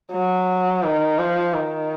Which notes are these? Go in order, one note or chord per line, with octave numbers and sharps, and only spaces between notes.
F#3
D#3
F3
D#3